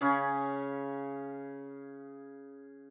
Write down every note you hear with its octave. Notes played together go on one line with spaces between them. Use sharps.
C#3 C#4 G#4